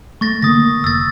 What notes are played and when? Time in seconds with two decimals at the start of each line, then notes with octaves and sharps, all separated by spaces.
0.21 A3 C#6 A6 A#6
0.42 D3 A#3 D#6 A#6
0.84 F1 E6 A6